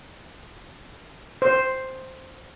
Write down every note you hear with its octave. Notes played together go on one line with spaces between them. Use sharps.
C5